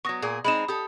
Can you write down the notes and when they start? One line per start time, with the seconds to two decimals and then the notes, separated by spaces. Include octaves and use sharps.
0.05 F#3 B3 C#6 D#6 A#6
0.22 A#2 G#4 A#4
0.45 G#3 C4 D#4 B5 E7
0.68 G4 A4 D#6